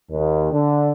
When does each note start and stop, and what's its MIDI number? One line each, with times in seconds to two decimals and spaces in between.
0.11 0.48 39
0.52 0.91 50